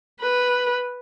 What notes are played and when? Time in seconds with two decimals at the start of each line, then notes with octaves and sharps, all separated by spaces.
0.21 B4